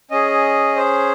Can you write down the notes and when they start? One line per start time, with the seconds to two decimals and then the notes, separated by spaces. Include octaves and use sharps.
0.11 C#4 G#4 D#5
0.76 C5